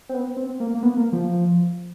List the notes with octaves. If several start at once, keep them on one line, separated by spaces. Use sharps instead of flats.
C4
B3
C4
A#3
A#3
B3
A#3
F3